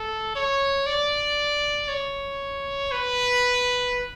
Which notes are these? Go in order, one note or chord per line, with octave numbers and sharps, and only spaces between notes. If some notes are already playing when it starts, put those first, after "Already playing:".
Already playing: A4
C#5
D5
C#5
B4